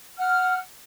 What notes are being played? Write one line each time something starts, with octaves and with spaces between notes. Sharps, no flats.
F#5 F6